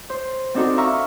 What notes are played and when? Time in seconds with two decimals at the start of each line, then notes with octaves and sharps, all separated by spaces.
0.10 C5
0.55 C4 D4 D#4 F#4 A4 A#4
0.77 E5 F5 A#5 C#6 E6 F6